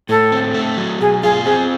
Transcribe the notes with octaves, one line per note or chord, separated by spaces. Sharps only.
A2 A4
C4
A3
F#3
B2 G#4
F4 G#4
C4 G#4